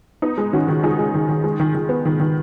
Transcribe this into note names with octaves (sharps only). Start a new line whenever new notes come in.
B3 D#4
G#3
D#3 C#4 F#4
D#3
G#3 D#4 G#4
G#3
D#3
D#3
G#3
D#3
D#3
B3
D#3
D#3